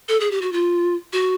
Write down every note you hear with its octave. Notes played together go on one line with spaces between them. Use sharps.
A4
G#4
G4
F#4
F4
F#4